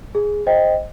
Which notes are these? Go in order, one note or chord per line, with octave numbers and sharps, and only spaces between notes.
G#4
C5 D#5 G5